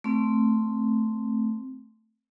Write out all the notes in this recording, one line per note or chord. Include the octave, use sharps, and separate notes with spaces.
A3 C4